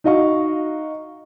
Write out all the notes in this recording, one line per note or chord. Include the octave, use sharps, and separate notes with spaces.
D#4 F#4 D#5 F5 C#6